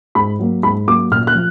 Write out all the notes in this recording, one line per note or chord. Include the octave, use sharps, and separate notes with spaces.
G#2 B5
F#3 A#3
G#2 B5
F#3 A#3 D6
A#2 F6
F#6
F3